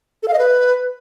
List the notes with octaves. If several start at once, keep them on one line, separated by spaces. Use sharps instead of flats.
A4
F5
D#5
B4